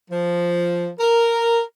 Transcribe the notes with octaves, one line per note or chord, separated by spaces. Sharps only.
F3
A#4